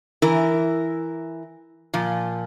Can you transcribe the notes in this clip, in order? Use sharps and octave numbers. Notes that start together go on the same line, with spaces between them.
E3 E4 A#4
A#2 F3